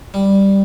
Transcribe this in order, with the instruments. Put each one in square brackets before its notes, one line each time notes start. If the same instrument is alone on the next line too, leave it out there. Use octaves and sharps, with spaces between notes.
[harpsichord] G3